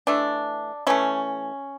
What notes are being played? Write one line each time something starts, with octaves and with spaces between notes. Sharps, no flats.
E3 A3 D4
E3 A3 C#4